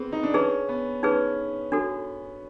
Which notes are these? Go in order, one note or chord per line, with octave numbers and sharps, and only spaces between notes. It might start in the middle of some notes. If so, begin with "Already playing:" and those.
Already playing: B3 C4 G#4
D#4
D4
C#4 D#4 G#4 B4
B3
C#4 D#4 G#4 B4
D4 F#4 A4